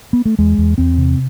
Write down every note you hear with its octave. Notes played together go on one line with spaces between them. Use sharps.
B3
A3
E2 G#3
E2
E2 C4
C3